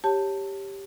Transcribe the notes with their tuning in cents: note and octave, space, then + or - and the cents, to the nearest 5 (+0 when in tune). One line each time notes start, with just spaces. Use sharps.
G4 +0 C#5 -10 A5 +15